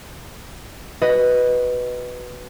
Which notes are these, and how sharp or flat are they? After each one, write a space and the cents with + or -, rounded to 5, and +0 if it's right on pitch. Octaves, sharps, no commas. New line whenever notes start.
F#4 +10 B4 +0 D#5 +0